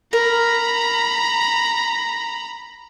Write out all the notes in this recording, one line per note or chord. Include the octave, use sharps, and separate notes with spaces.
A#4 A#5 B5